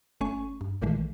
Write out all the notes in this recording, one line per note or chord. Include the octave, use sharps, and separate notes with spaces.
G1 A3 C#4 G#5 C#6
G2
A#1 A#2 D#3 E3 G#3 A3